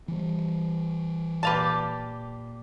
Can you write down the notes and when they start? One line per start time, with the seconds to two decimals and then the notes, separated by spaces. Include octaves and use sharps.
0.08 E3 G3
1.43 A#2 G4 B4 F5 A5